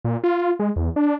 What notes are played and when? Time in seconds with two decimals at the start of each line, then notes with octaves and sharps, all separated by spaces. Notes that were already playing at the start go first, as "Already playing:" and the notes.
0.04 A#2
0.24 F4
0.60 G#3
0.76 E2
0.96 D4